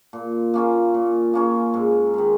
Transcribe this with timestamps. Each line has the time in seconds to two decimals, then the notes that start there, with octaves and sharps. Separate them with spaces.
0.13 A#2
0.54 A#3 C#4 F4
0.94 A#2
1.33 A#3 C#4 F4
1.74 G#2
2.14 D#3 G#3